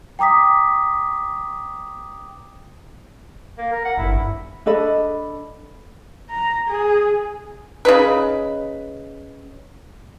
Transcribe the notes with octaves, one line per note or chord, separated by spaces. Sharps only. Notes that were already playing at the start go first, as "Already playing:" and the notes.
G5 A#5 D6 D#6 B6
A#3
A#4
F#5
G1 E4
D4 A4 D#5 B5
A#5
G#4
C#3 D#4 B4